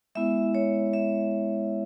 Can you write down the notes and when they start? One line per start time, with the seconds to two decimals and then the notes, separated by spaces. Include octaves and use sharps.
0.15 G#3 B3 E4 E5
0.55 C#5
0.93 E5